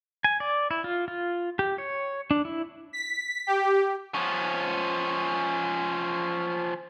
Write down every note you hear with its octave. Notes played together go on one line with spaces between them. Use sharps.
G#5
D5
E4
F4
F4
G4
C#5
D4
E4
B6
G4
F3 C#4